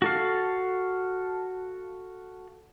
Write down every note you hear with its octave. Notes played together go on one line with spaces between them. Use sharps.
F#4 A4 F5